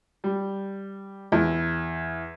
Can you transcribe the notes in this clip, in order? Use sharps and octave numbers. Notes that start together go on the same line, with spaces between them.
G3
E2